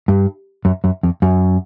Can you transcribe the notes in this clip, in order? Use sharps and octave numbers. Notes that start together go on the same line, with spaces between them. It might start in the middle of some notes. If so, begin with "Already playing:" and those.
G2
F#2
F#2
F2
F#2